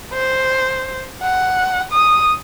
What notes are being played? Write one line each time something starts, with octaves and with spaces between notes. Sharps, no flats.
C5
F#5
D#6